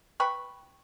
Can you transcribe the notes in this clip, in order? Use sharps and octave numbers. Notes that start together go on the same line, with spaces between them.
B4 G5 B5 C#6